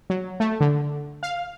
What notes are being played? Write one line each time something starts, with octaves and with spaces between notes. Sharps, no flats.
F#3
A3
D3
F5